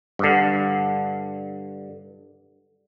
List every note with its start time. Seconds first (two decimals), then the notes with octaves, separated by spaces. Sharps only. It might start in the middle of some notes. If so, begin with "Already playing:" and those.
0.19 G2 D3